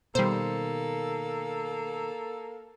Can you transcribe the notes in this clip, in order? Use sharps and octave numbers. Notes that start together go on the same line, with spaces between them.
B2 D#3 G3 A#3 A4 C5